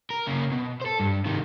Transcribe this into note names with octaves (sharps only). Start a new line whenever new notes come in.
A#4
C#3 A#3
B2
A4 C5
G2
C3 D#3